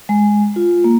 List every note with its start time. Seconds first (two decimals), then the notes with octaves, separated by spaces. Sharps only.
0.09 G#3
0.56 F4
0.84 A#3